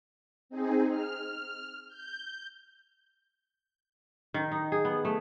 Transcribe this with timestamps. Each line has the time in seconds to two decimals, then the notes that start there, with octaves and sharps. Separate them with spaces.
0.49 C4 D#4 G#4
0.90 F6
1.88 G6
4.34 D#3
4.52 D#4
4.72 G#4
4.85 B3
5.05 A3